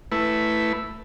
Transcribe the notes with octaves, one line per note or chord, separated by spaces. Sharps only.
A3 E4 B4